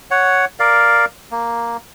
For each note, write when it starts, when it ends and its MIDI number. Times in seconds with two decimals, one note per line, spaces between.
0.11 0.45 73
0.11 0.45 78
0.60 1.05 70
0.60 1.05 74
0.60 1.05 77
1.31 1.77 58